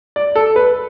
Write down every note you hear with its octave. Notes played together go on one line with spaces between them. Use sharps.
D5
A4
B4